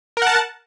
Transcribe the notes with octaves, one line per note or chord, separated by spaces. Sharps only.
A#4 F#5 A5